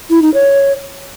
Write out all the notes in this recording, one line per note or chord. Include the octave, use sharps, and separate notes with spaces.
E4
D#4
C#5